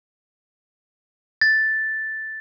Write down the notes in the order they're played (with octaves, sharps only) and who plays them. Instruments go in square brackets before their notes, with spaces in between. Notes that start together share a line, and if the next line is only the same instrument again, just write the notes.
[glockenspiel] A6